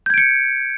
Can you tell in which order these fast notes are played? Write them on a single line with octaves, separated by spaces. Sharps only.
G6 G#6 D7 C#7